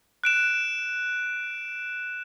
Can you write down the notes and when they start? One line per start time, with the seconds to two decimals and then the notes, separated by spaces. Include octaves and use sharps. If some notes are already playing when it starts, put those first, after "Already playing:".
0.24 F#6 D7 E7